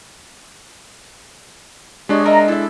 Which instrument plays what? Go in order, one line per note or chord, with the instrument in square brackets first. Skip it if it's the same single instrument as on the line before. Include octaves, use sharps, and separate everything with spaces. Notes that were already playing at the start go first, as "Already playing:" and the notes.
[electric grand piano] G#3 D4 [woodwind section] G4 C#5 D#5
[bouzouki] A#4 D#5 E5 [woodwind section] A#5
[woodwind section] E4 [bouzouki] A4 E5